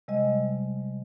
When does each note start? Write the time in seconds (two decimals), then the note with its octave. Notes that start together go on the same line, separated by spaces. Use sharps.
0.08 C3 G3 G#3 D#5